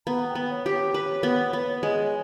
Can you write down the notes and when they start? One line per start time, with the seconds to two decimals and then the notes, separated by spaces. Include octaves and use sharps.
0.07 B3 A#5
0.29 G5
0.35 B3
0.50 C#5
0.66 G4
0.72 C#5
0.94 B4 C#5
1.23 B3
1.53 B3
1.83 G#3